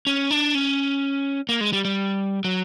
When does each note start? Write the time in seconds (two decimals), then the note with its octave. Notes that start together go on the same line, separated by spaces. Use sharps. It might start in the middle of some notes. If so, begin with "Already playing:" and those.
0.07 C#4
0.31 D4
0.55 C#4
1.49 A#3
1.61 G#3
1.73 G3
1.85 G3
2.45 F#3